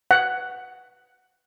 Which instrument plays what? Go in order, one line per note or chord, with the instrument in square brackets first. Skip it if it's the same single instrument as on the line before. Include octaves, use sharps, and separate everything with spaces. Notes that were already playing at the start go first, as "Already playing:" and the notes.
[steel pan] F#5